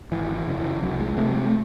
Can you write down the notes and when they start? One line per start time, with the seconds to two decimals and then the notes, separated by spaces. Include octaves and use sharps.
0.12 G#1 E3
0.35 E3
0.47 F#2 C#3
0.59 E3
0.82 C2 F#3
0.99 G#3
1.17 C3 A3
1.30 F#3
1.36 G#3
1.46 A3